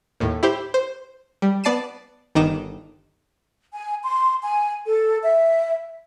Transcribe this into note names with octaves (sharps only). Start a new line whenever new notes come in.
D#2 A2
E4 G4 C5
C5
G3
B3 D5 A5 C7 D#7 E7
G1 D#3 D#4 D6 E7
G#5
C6
G#5
A4
E5